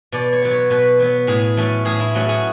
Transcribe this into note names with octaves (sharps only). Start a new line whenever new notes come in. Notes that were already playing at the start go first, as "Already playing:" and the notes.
B2 D5
C#5
F#3 B3
C#5
B2 B4
F#3 B3
A2 G#4
F#3 A3 C#4
A2 G#4
E4
F#3 A3 C#4 F#4
G#4